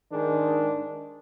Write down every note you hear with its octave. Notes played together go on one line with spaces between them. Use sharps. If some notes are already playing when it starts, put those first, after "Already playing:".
G#2 D#3 G#3 D4